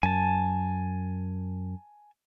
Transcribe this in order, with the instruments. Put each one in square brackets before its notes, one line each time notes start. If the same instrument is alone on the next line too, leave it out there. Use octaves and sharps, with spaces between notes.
[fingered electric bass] F#2 [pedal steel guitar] G#5 A5